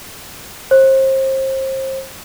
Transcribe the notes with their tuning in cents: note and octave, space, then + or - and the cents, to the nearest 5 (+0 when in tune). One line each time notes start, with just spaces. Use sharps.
C5 +30